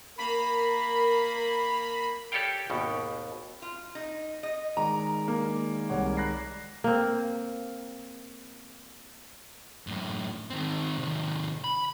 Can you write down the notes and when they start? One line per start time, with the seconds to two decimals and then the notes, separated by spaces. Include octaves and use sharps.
0.18 A#3 A#4 B5
2.32 G4 A4 C#5 D5 F5 G5
2.70 G#1 D#2 B2
3.62 F4
3.95 D#4
4.43 D#5
4.77 D#3 G#3 D5 A#5
5.28 A#3
5.89 C2 C#5 F#5
6.17 F#6 A#6 C7
6.84 A#3 C4
9.87 F#2 A2
10.50 D#3 C4
10.98 C3 D#3
11.64 B5